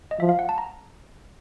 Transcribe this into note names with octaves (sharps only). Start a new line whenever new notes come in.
D#5
F3 E5
F5
F#5
A5
A#5